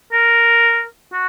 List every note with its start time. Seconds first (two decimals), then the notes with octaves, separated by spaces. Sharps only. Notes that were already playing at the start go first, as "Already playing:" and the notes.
0.13 A#4
1.13 F#4